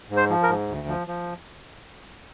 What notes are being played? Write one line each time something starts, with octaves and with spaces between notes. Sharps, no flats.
G#2
C5
F3
A#4
G#2
D2
F3
F3